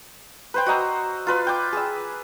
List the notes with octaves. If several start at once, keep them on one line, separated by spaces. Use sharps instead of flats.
B4 C5 G5
F#4 D#5 A#5 E6
F4 B4 C6
G5 D6
G#4 E6